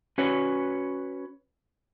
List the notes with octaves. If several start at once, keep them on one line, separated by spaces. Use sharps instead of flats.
C#4 F#4 B4 C#5